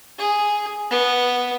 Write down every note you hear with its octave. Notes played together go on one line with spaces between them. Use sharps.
G#4
B3